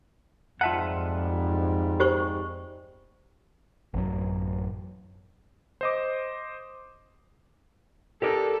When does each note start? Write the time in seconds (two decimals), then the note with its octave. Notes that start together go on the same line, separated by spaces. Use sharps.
0.61 F2 G#2 G3 F4 E5 F#5 A5
2.00 G4 C5 C#6
3.94 A1 F#2 F#3
5.81 C5 D#5 D6
8.22 G4 A4 A#4 D5